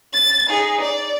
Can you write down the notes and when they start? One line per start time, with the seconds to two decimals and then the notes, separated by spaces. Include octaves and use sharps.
0.13 A6
0.50 D#4 G#4
0.81 D5